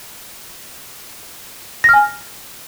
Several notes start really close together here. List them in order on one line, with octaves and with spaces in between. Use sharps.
A#6 F6 G#5